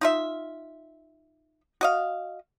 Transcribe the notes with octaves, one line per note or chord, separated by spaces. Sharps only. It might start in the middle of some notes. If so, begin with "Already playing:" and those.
D#4 F4 E5
F#4 D#5 F5